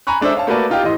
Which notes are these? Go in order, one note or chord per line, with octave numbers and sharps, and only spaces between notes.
G#5 A#5 B5 C#6 F#6
G#3 D4 A4 C5 E5
C#5 F5 A5
A3 A#3 F#4 B4 D5 A5
D#4 F4 G4 G5
A2 E3 D#5 C6